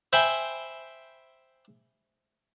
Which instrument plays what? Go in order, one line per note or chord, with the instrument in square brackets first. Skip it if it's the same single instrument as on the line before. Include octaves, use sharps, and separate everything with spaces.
[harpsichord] C5 E5 G5 G#5 B5